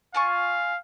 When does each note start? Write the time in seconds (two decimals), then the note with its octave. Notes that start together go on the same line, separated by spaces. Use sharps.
0.14 F4 F5 G#5 C#6